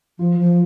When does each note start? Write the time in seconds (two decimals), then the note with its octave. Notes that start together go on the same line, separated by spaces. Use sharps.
0.19 F3 F4
0.39 F3